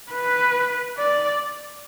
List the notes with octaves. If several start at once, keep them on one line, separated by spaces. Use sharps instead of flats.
B4
D5